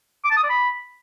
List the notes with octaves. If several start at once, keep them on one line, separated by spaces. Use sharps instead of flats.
D6
A5
D#6
D5
B5